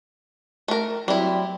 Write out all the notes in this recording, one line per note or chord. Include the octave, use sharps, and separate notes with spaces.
A3 A#4
F#3 G3 C4 E4